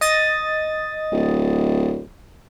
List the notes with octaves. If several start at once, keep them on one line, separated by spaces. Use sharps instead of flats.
D#5 D#6 A6
D1